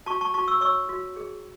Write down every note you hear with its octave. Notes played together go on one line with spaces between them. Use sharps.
F#4 A5 C#6
A5 C#6
F#4 A5 C#6
C#6 E6
C#5 C#6 E6
F#4
G#4